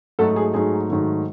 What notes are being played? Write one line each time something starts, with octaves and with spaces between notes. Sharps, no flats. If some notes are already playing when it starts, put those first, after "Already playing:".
G#2 F#3 A3 D#4 F#4 A4
G#4
G#2 F#3 A3 D#4 G#4
G#2 D#3 F#3 A3